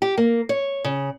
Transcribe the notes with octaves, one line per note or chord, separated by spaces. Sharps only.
G4
A#3
C#5
C#3